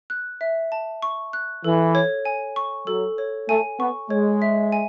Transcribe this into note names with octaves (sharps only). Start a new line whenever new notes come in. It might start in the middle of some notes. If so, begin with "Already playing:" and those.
F#6
E5
A5
C#6
F#6
E3 A4
C#5
G#5
C#6
F#3 A4
C#5
A3 G#5
B3 C#6
G#3 C#5
E5
G#5